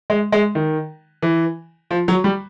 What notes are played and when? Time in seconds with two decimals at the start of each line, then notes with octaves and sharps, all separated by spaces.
0.10 G#3
0.32 G#3
0.55 D#3
1.22 E3
1.91 F3
2.08 F#3
2.24 G3